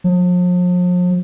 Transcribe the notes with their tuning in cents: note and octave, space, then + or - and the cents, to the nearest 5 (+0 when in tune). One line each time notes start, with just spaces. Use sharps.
F3 +40